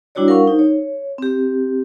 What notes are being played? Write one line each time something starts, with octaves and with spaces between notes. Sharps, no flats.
G3 D4 E4 F#4 C#5 D5
A#4 F5 F#5 C#6
D#4 C5
C#5
C4 G4